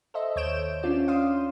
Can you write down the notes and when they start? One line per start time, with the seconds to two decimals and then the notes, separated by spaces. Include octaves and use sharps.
0.14 A4 C5 D#5 E5
0.36 D#2 C#5 G6 D7 E7
0.83 C#4 D4 F4 D5
1.08 F5 C6 D#6